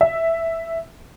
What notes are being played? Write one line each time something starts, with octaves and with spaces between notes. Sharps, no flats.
E5